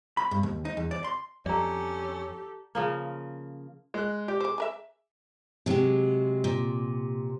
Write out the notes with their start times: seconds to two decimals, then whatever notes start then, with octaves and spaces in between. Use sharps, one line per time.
0.17 B5
0.31 G2
0.43 D#2
0.65 D#4
0.77 E2
0.91 D5
1.04 C6
1.46 F2 C#4 G4 A4 D5 A#5
2.75 C#3 F3 A#3
3.94 G#3 F#6
4.28 G4 D5
4.40 G#4 C5 D6
4.58 G#4 A#4 E5
5.66 C3 F#3 G#3 G4
6.44 A#2